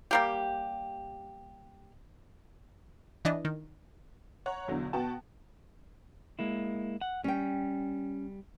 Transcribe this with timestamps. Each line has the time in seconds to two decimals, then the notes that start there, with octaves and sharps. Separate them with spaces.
0.11 G3 A#3 G4
3.25 E3 D4 D#5
3.45 D#3
4.46 C#5 F#5 A#5
4.68 B1 E2 B2 D3 F#3
4.93 B2 B3 F#4 G5 A5
6.39 G#3 A#3 E4
7.01 F#5
7.24 G3 C#4 G5